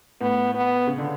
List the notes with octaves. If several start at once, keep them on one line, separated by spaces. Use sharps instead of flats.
A2 B3
B3
C#3
D3